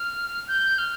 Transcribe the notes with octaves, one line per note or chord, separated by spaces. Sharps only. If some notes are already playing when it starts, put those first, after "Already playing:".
Already playing: F6
G6
F6